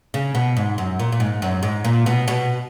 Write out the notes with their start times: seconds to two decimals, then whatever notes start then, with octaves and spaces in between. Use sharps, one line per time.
0.14 C#3
0.35 B2
0.57 G#2
0.78 F#2
0.99 A#2
1.12 A#2
1.20 G#2
1.42 F#2
1.63 G#2
1.84 A#2
2.06 B2
2.28 B2